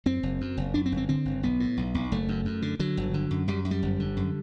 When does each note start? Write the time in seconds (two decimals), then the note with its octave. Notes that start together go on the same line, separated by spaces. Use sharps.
0.06 F#2 C4
0.23 F#1
0.41 F#2
0.57 F#1
0.74 F#2 D4
0.86 C4
0.92 G1
0.97 C4
1.09 D3 C4
1.25 G1
1.43 B1 B3
1.60 A2
1.77 B1
1.94 B1
2.12 F#1 A3
2.29 F#2
2.45 F#2
2.62 D3
2.79 D3 F#3
2.97 G1
3.14 D3
3.31 F#2
3.48 F#2 G3
3.65 F#2
3.71 G3
3.82 G1
4.00 D3
4.17 F#2